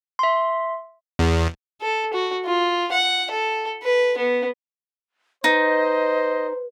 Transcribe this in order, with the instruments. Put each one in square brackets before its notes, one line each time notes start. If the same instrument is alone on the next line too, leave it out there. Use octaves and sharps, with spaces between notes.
[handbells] E5 C6
[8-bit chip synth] E2
[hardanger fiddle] A4
F#4
F4
F#5
A4
B4
B3
[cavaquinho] D#4 [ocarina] B4 [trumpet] C5 [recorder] D#5